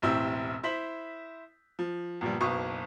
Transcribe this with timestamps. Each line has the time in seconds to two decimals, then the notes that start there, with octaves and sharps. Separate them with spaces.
0.02 E1 A1 C4 E4 G4 E6
0.63 E4 C5 B6 F#7
1.79 F3
2.21 G1 A#2 F3 G3
2.41 F#1 B1 B4 C#6 D#6